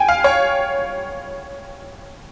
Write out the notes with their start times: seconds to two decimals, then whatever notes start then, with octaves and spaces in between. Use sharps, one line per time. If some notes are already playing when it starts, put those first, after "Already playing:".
Already playing: G5 G#5
0.09 F5
0.24 C#5